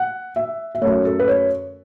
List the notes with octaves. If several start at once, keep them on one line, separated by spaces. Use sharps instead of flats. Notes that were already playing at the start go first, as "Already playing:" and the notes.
Already playing: F#5
E5
E5
F#2 F#3 A3 C#5
A4
B4
C#5